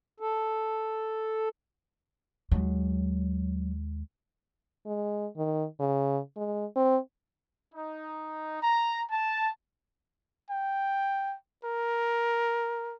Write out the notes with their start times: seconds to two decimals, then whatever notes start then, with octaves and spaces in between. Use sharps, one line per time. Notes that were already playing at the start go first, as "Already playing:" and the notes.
0.20 A4
2.51 D#2 F#3 G#3
4.86 G#3
5.37 D#3
5.80 C#3
6.37 G#3
6.76 C4
7.73 D#4
8.62 A#5
9.10 A5
10.51 G5
11.64 A#4